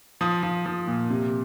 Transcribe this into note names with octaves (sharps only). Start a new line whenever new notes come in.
F3 D#6
F3
F3
A#2
C3